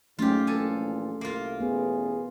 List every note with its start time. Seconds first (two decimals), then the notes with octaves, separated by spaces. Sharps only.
0.19 G#2 F#3 A3 C#4 F4 G4
0.47 A#1 A#2 E3 A4 G#5
1.21 C2 A#3 F4
1.60 A1 B3 G#4